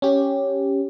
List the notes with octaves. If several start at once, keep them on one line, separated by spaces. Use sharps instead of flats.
C#4 G4